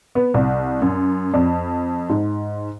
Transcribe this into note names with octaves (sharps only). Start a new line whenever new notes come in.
B3
C2
F#2
F2
G#2